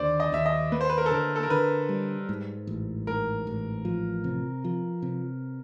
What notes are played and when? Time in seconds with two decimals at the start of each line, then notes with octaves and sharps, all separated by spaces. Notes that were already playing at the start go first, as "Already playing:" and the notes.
Already playing: D#2 D3 C5 D5
0.20 D#5
0.32 D#2 E5
0.46 D#5
0.72 A#3 B4
0.81 C5
0.90 B4
0.98 A#4
1.06 A4
1.11 D3 A#4
1.36 A4
1.43 A#4
1.50 D3 B4
1.89 G3
2.29 G#2
2.67 A1
3.07 G#2 A#4
3.47 A1
3.85 F3
4.24 C3
4.64 F3
5.02 C3